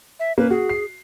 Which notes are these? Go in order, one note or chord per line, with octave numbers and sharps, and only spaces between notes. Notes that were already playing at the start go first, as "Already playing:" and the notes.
E5
A#3 C#4 B4
F#4 G#4
C7